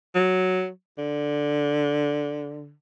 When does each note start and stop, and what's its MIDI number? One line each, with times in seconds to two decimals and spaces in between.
0.15 0.69 54
0.98 2.73 50